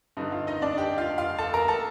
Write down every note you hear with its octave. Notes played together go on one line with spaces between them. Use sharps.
G2 D3 D#4
F4
D#4 D#5
D4 D5
G4 G5
F4 F5
F4 F5
A4 A5
A#4 A#5
A4 A5